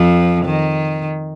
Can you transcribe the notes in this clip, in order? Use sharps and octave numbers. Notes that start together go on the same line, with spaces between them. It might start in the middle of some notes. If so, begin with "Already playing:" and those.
Already playing: F2 F3
D#3